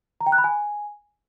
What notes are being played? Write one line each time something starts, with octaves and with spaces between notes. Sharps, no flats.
A#5
G5
F#6
B5
G#5